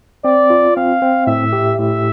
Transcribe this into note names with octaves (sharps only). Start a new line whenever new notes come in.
C4 D5
F4
C4 F5
C4
A2 E5
G4
A2 E5